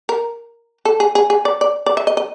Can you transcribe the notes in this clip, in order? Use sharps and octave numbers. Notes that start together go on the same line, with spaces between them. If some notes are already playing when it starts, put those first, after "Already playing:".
A#4
A4
G#4
G#4
G#4
D5
D5
D5
E5
D#5
D#5